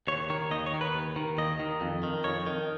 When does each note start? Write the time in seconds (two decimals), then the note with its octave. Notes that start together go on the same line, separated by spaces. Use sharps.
0.07 D#2 C#5
0.30 D#3 C#5
0.51 D#2 D#5
0.66 C#5
0.74 D#3
0.81 B4
0.94 D#2
1.16 D#3
1.38 D#2 D#5
1.59 D#3
1.81 F2
2.03 D#3
2.24 F2 C#5
2.47 D#3